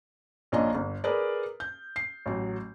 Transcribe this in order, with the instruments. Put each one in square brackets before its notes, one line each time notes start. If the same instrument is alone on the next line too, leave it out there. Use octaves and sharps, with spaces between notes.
[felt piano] A#1 C#4 D4 F4 D#5 A#5
G1
G#4 A#4 B4 D5
G6
C7
A1 F#3